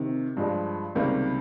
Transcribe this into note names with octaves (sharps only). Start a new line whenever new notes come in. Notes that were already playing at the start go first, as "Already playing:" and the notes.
Already playing: C3 D#3
G2 F3 G#3
C#2 C3 D#3 G3 A#3